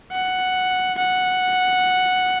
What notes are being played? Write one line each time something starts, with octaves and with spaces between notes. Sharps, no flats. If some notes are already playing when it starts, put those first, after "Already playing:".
F#5
F#5